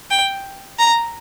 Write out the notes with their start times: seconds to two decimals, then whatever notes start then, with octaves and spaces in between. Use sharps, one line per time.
0.10 G5
0.79 A#5